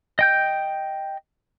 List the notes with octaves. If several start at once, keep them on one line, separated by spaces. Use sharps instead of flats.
D#5 G5 G6